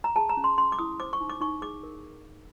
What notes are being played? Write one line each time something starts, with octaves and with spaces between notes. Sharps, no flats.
A#5
G#4 A5
A#5
C#4
C6
C#4 C6
D6
E4 D#6
C5 D6
C#6
D#4
D6
D#4 C#6
G#4 D6
A#4